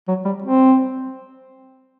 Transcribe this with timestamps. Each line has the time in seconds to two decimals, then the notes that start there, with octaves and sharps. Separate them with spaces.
0.08 F#3
0.25 G3
0.42 C4